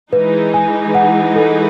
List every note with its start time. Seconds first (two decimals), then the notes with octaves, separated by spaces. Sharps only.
0.12 E3 G#3 D#4 B4
0.54 G#5
0.95 F#5
1.36 A4